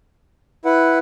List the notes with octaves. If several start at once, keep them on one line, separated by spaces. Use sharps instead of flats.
E4 B4 F#5